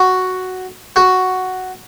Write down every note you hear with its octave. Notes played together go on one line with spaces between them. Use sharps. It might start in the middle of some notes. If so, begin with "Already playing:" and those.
Already playing: F#4
F#4